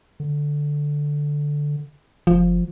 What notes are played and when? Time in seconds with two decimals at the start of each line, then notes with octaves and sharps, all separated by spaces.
0.20 D3
2.27 F#1 F3